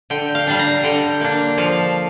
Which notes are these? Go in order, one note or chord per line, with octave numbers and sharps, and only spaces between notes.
D3 G5
F5
G3 D4
A#5
D3 G5
A#3 D4
F3 F5